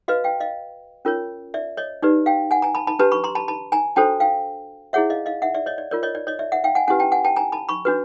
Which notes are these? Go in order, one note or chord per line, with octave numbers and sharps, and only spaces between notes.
F#4 B4 D#5 F5
F5 G5
D#5 F5
C#4 F4 A#4 C#5
D5 E5
C#5 D#5
D#4 G4 B4 D5
F5 G5
F#5 G#5
G#5 A#5
A5 B5
A5 B5
D4 G4 B4 A5 B5
B5 C#6
A#5 C6
A5 B5
A5 B5
G#5 A#5
D4 F#4 A4 C5 G5 A5
F5 G5
E4 G#4 C#5 E5 F#5
D#5 F5
D#5 F5
E5 F#5
D5 E5
C#5 D#5
D5
F4 A#4 C#5 D5
C#5 D#5
D5
C#5 D#5
D5 E5
E5 F#5
F5 G5
F#5 G#5
C#4 E4 G4 B4 F#5 G#5
G5 A5
F#5 G#5
G5 A5
G#5 A#5
A5 B5
B5 C#6
D4 F#4 B4